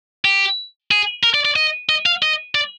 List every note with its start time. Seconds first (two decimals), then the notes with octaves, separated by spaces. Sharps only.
0.25 G4
0.91 G#4
1.23 A#4
1.34 D5
1.45 D5
1.56 D#5
1.89 D#5
2.06 F5
2.22 D#5
2.55 D5